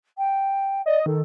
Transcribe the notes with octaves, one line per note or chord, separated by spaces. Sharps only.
G5
D5 D#5
D#3 A4